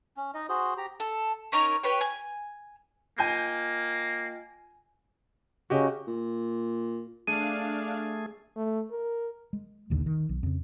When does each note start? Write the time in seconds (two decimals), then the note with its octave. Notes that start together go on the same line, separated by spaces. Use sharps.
0.17 C#4
0.34 D#4 D#5
0.49 F#4 G#4 C5
0.77 G4 A#5
1.00 A4
1.52 C#4 D#4 A#4 C#5
1.83 G4 B4 C#5 G5
2.01 G#5
3.19 A#3 F4 D#5 G5 G#5 G6
5.70 C#3 F#4 G4 D#5
6.07 A#2
7.27 A3 D4 G#4 F5 D#7
8.56 A3
8.91 A#4
9.53 G#3
9.90 A#1 D#2 D3
10.06 D#3
10.29 B1
10.43 F2 C#3